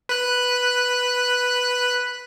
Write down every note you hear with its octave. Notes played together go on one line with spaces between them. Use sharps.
B4 F#6